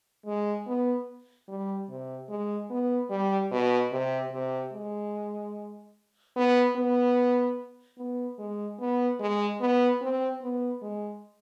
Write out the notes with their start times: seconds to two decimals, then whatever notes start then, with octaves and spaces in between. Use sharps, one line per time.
0.26 G#3
0.66 B3
1.48 G3
1.89 C3
2.29 G#3
2.70 B3
3.10 G3
3.51 B2
3.92 C3
4.32 C3
4.73 G#3
6.36 B3
6.76 B3
7.98 B3
8.39 G#3
8.80 B3
9.20 G#3
9.61 B3
10.01 C4
10.42 B3
10.82 G#3